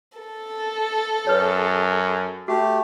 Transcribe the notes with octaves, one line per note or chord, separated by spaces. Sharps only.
A4
F#2 B4 C#5
A3 F#4 G4